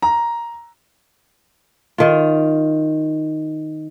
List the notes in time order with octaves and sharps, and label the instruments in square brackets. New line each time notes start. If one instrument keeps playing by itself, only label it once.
[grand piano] A#5
[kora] D#3 F4